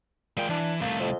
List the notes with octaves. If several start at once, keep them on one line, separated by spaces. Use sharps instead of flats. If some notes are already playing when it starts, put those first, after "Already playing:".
A#2 G#3 G5
E3 D4
C2 A3 A#3
F2